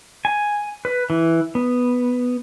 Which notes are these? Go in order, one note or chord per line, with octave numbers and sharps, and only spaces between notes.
G#5
B4
E3
B3